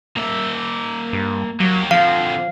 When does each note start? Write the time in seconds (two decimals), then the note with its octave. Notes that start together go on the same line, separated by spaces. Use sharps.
0.17 A#3 E5
1.13 G2
1.60 F#3 A#3 G4
1.91 D3 F3 C4 F5